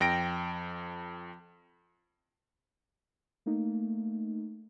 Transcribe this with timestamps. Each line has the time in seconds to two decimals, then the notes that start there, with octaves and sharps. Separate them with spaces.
0.01 F2 G5 A#6 D7
3.46 A3 A#3 D#4